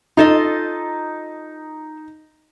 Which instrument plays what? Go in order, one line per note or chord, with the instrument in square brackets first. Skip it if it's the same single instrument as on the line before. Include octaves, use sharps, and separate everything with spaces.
[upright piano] D#4 [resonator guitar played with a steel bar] F4 A4 D#5